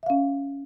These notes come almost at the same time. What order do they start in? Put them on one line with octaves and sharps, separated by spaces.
E5 F5 C#4